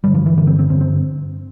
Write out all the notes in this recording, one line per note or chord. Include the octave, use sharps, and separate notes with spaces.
G2 D3 G3
F3
E3
G2 D3 E3
C4
C4
G2 D3 C4
C4